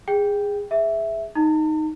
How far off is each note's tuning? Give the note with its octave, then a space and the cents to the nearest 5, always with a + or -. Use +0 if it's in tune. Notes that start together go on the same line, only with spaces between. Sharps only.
G#4 -20 G5 +0
G#4 +0 E5 +0
D#4 +0 A5 +45